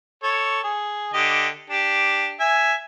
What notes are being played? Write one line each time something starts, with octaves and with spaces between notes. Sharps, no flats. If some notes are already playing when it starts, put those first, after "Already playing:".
A4 C#5
G#4
D3 G4 D#5
D4 G4
E5 G#5